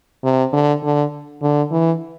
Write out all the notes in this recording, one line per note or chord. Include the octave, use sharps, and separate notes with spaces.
C3
D3
D3
D3
E3